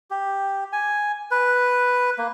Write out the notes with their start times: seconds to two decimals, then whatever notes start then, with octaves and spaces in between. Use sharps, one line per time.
0.11 G4
0.73 G#5
1.31 B4
2.18 A#3